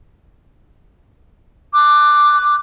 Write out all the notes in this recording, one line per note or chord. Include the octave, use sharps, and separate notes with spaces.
D6 F#6